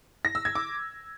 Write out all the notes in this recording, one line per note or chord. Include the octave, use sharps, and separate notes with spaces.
A#6
E6
G#6
D6